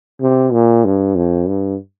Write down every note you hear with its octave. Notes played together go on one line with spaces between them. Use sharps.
C3
A#2
G2
F2
G2